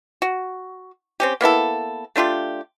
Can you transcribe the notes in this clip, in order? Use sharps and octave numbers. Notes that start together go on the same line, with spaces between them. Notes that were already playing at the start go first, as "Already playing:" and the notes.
F#4
C4 C#4 G4
A#3 B3 E4 A4
A3 D4 F4 G4